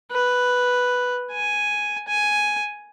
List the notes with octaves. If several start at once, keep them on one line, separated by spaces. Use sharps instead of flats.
B4
G#5
G#5